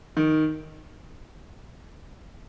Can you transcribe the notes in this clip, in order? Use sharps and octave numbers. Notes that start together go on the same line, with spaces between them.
D#3